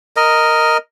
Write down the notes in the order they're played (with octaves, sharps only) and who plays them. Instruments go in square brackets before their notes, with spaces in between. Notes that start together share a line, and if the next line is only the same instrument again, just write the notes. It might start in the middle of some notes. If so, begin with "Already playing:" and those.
[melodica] A#4 D#5